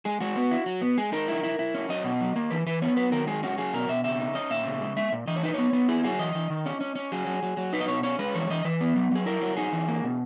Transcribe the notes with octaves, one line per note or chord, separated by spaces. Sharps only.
G#3 G#4
G#3 F#4
B3
E4
F#3
B3
G#3 G#4
D#4 A#4
E4
E4
E4
C#4
F#3 D#5
B2
F#3
A#3
E3 B4
E3 B4
B3 C#5
F#3 B4
D#3 A#4
G#3 G#4
C#4 F#4
F#3 G#4
B2 A#4
B2 E5
C#3 E5
D#4
C#4 D#5
A#2 E5
C#3
G#3
G#3 E5
A#2
E3 D#5
C#5
D#4 B4
B3 C#5
B3
E4 G#4
F#3 G#4
E3 D#5
E3
D#3
C#4
C#4
C#4
F#3 G#4
F#3
F#3
F#3
D#4 B4
D#5
B2 C#5
C#4 C#5
G#3 B4
E3 C#5
E3 D#5
E3 B4
B3
F#3
F#3 G#4
E4 A#4
F#3
D#4 G#4
E3
A#3
B2